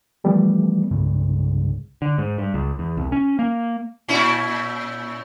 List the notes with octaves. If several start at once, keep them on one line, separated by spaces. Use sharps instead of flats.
E3 F3 G3 A3 B3
C2 G2 C#3 G#3
D3
G#2
G2
C#2
E2
C2
C#4
A#3
A#2 C#4 E4